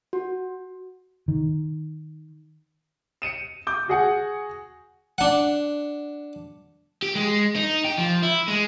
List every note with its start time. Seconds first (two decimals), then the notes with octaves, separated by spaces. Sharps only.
0.13 F#4
1.28 D#3
3.22 C#7 D#7 E7
3.67 D6 G6
3.88 F#4 G#4 F#5 G#5
5.18 D4 F#5
7.03 G4
7.15 G#3
7.56 D#4
7.85 G4
7.98 F3
8.23 E4
8.48 G#3